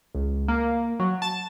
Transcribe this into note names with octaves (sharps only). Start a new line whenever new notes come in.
C#2
A#3
F#3
A5